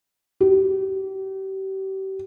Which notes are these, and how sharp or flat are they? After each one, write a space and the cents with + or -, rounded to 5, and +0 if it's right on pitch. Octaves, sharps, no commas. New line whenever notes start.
G4 -35